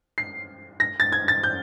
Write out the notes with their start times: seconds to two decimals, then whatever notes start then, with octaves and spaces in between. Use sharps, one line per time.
0.18 C7
0.80 A#6
1.00 A6
1.12 G#6
1.28 A6
1.43 G6